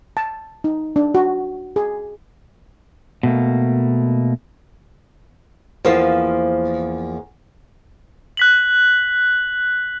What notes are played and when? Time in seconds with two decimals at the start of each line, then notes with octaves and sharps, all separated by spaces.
0.17 A5
0.64 D#4
0.96 D4
1.15 F#4
1.76 G#4
3.23 B2 A3 A#3
5.85 E2 F3 A#3 F4 C5 F5
8.37 F#6 B6 F#7